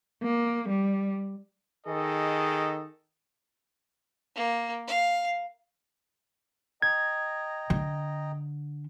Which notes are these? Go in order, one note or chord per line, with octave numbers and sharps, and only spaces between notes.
A#3
G3
D#3 G#4 A4 D#5
A#3
F5
D#5 G5 A#5 G#6
D3